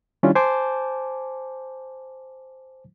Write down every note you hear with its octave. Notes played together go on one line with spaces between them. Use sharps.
D#3 G3 C#4 D4 E4 F4
C5 G#5 A5 D6 G6